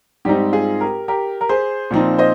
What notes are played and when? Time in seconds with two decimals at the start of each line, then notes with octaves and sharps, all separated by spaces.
0.25 G#2 G3 C4 D#4 G4
0.53 F4 G#4
0.80 G4 A#4
1.08 G4 A#4
1.41 A#4
1.49 G#4 C5
1.91 A#2 F3 C4 D#4
2.18 C5 D#5